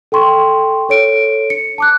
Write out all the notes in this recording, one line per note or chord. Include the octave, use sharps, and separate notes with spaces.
A4 G5 C6 C#6
A4 C#5 D7
C#7
A5 D6 F#6